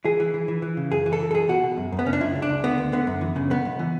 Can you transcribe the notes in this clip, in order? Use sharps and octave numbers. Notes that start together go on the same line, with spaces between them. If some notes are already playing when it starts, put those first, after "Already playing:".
E3 G#4
E3
E3
E3
E3
C#3
F#2 G#4
E3
A4
E3
A4
B1 G#4
B2 F#4
B2
F#2
F#2
B3
C#3 C#4
D4
C#2 E4
C#2
D4
C#2
D3 B3
D2
D3 B3
F#2
E3
C#3
B1 B3
B1
E3